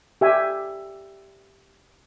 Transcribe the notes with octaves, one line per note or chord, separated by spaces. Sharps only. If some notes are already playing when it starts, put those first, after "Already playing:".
G4 E5 G#5